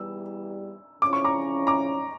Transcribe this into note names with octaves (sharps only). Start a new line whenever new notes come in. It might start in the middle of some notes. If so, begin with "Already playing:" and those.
Already playing: E2 E3 G3 E6
F2 C#3 F3 C#4 E4 D6
C#6
A#5 D6
A#5 D6